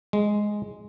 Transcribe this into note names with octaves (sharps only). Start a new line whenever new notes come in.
G#3